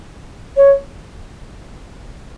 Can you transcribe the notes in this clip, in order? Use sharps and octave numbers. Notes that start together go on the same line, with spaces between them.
C#5